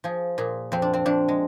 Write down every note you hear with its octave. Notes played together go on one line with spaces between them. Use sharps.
F3 G#4
A#2 G#4
F2 C4
D4
C4
F2 D4
G#3